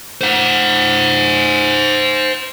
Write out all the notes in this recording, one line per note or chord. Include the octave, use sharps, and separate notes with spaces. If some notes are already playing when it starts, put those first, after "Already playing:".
C5 F#5